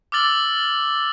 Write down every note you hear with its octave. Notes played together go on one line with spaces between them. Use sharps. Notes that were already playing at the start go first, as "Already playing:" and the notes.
D6 E6 F6 A6 F#7 G7